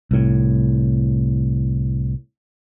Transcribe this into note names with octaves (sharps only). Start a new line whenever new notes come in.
C2 A2